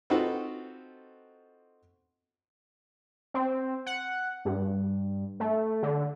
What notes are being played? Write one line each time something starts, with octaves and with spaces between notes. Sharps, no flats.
C4 D#4 F4 F#4 A4 B4
C4
F#5
G2
A3
D3